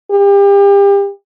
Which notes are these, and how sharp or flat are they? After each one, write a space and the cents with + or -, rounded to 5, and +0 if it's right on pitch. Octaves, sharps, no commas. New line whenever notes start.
G4 +35